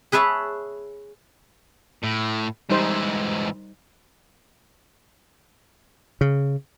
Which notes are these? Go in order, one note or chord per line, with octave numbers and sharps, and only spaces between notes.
G#4 B4 C#5 E5 A5
A2
G#2 E3 G3 D#4 C5
C#3